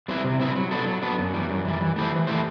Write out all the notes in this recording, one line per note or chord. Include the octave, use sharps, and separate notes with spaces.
G3 C4 E4 B4
C3
G3 C4 E4 B4
F#3
B3 D4 F#4 A4
F#3
B3 D4 F#4 A4
F#2
E3 G3
F#2
E3 G3
E3
A3 E4 G4 C5
E3
A3 E4 G4 C5